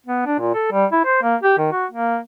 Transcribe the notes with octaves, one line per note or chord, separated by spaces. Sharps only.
B3
D4
A#2
A4
G3
E4
C5
A#3
G4
D#3
F#4
A#3